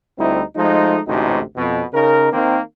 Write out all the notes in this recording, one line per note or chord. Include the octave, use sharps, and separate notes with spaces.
D2 G3 C4 D#4 E4
F3 G#3 A3 D#4
A1 D2 G#2 C3 D#4 F#4
F2 B2
C#3 D#4 A#4
D#3 A#3 C4